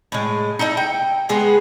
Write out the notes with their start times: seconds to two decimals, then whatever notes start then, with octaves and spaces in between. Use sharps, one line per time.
0.12 A2 G#3
0.59 D#4 E4 A4 D#5
0.77 G5
1.29 G#3 B3 G#4 B4